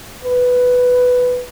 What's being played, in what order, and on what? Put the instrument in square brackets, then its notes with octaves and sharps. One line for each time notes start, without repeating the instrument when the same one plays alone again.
[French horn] B4